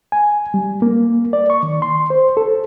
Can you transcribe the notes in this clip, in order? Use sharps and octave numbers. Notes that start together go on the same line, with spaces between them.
G#5
G3
A#3
D5
C#6
D#3
C6
C5
A4